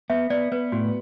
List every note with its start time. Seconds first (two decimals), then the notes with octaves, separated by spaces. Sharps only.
0.10 B3 E5
0.30 B3 D5
0.52 B3 B4
0.72 A2 F#4